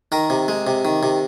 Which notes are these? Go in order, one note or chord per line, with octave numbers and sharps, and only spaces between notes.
D#3 A#4
C3
G#3
C3
D#3
C3